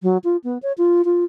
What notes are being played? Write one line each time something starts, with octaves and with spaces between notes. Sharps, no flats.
F#3
F4
B3
C#5
F4
F4